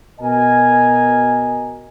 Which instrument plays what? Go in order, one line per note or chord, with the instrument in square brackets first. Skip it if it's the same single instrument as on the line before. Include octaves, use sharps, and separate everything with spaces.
[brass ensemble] B2 A#4 D#5 G#5